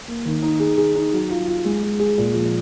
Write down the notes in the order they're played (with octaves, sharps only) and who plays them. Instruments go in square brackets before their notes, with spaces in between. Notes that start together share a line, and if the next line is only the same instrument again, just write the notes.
[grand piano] A#3
D#3
D#4
G#4
G#4
D#4
F#3
F4
F4
G#3
G#3
G#4
A#2
F3